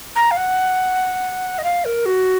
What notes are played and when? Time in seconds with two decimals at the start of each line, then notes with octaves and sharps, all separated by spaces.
0.16 A#5
0.31 F5
0.37 F#5
1.58 D#5
1.64 F5
1.85 A#4
2.06 F#4